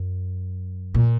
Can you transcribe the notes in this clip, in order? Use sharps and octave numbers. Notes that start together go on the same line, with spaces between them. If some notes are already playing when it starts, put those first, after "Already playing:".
Already playing: F#2
A#2